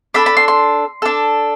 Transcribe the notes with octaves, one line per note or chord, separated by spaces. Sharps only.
D4 A4 B5
B5
C6
C6
D4 A4